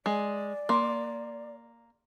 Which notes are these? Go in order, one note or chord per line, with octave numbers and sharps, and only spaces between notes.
G#3 D5 G#5
A#3 C6